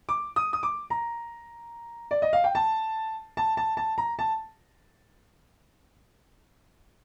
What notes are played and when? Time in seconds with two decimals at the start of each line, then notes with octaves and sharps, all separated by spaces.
0.09 D6
0.36 D#6
0.53 D#6
0.63 D6
0.90 A#5
2.11 D5
2.22 D#5
2.33 F5
2.44 G5
2.55 A5
3.37 A5
3.57 A5
3.77 A5
3.98 A#5
4.19 A5